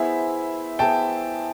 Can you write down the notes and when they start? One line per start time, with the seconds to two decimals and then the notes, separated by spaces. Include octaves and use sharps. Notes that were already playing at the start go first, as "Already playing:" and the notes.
Already playing: B3 E4 G#4 C5 E5
0.79 B3 E4 G#4 C5 G5 A5